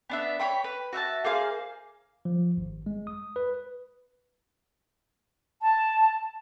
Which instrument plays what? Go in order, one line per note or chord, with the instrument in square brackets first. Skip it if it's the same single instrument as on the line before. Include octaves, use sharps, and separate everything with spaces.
[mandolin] B3 D4 E5
C#5 F#5 G5 B5
B4
F#4 E5 F#5 A5
A#3 G#4 C5 F5
[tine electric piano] F3
G#1
G#3
D#6
B4
[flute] A5